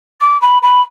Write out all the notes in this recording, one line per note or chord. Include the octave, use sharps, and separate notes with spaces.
D6
B5
B5